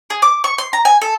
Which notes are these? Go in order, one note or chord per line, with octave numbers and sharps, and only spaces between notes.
G#4
D6
C#6
C6
A#5
G#5
A4